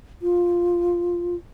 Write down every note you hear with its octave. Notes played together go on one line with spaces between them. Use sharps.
F4